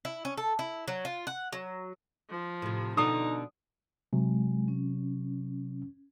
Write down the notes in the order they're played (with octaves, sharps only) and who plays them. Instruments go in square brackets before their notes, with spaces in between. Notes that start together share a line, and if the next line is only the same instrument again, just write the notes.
[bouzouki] E4
C#4
A4
E4
F#3
F4
F#5
F#3
[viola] F3
[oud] A2 C3
[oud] B2 D3 F#4 [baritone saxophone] D#4 [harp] D#6
[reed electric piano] C3 F#3 [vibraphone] G#3
[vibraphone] C#4